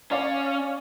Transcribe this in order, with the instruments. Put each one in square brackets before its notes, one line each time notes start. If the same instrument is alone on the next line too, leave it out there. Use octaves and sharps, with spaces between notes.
[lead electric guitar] C#4 [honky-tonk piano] C#5 D5 F5